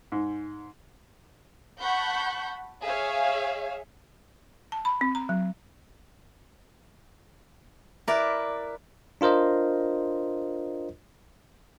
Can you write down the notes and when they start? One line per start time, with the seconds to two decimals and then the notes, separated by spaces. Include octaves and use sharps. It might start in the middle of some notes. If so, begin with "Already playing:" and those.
0.12 G#2
1.81 F#5 A5 B5 C#6 G6
2.85 G#4 C#5 E5 F5
4.72 A5
4.85 B5
5.01 C4
5.15 A#5
5.29 F#3
8.08 E4 A#4 B4 D5
9.21 D4 F4 A#4 C5 D#5